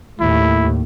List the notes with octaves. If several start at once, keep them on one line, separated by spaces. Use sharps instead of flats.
D#2 A2 E4